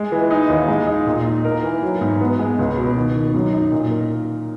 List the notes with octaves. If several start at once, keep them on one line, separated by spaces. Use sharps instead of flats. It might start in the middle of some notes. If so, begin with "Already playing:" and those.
Already playing: G#3
E3
D#4
D#2
G#3
D#4
A#2
D#4
A#4
E3
F#3
G#2
B3
G#3
C#2
B2
D#3
D#3
F#2
D#4
A#2
A#4